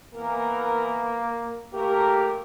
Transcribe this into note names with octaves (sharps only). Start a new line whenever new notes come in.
E3 A#3 B3 A#4
A3 A#3 G4 A#4